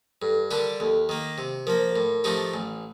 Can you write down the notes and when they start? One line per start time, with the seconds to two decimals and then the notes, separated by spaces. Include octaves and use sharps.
0.22 G2 A4
0.51 D3 G3 D4 G4 A#4
0.80 D#2 A4
1.09 D#3 A#3
1.38 C3
1.67 F3 A#3 A#4
1.79 C5
1.92 A2 A#4
2.24 F3 A3 D#4 G4
2.54 A1